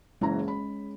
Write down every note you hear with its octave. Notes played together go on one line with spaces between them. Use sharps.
F#1 E3 G#3 C#4 A#5
B5